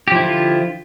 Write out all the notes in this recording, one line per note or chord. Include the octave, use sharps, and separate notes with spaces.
D3 F3 E4 F4 G4